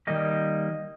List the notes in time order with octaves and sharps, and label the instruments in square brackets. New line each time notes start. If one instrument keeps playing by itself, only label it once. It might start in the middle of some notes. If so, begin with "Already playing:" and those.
[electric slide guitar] D#3 G3 A#3 D#5